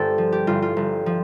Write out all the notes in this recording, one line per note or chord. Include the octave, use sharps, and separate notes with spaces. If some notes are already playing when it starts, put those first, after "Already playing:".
Already playing: G1 G4 A4 C5
F3
G4
G1 F4
F4
G1
F3